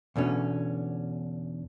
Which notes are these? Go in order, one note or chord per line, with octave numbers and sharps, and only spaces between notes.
E2 B2 D3 C#4